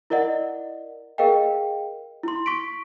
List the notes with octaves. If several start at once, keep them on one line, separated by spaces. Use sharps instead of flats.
E4 A#4 D5 D#5 F#5
G#4 A#4 D#5 F5 G5
E4 C6
C#6 B6 D7